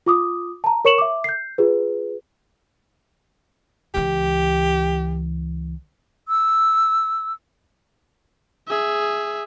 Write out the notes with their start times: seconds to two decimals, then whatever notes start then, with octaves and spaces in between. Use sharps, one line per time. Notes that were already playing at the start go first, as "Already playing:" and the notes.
0.06 F4 D6 D#6
0.64 A5 A#5
0.85 A#4 C#5 C#6 C#7 E7 F#7
0.98 E5 D6
1.24 G6 C7
1.58 F4 G#4 B4
3.95 C#2 E3 G4
6.28 E6
8.68 G#4 E5